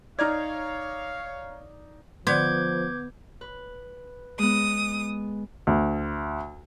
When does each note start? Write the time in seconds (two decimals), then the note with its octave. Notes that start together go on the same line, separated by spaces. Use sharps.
0.19 D#4 C#5 D5 F5 A#5 F6 G#6
2.27 D3 F3 B3 D5 D6 G6 G#6
3.41 B4
4.39 G#3 B3 D#6
5.67 D2